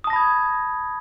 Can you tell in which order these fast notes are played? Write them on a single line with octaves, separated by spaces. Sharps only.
D#6 A5 A#6 B5 G#6